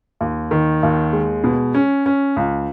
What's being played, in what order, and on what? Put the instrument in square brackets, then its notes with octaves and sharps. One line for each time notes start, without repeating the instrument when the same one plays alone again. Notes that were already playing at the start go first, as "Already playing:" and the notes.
[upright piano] D#2
D#3
D#2
G#3
B2
C#4
C#4
C#2